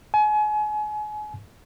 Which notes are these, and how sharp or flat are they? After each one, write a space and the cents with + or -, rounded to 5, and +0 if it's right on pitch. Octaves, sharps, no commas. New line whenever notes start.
G#5 +35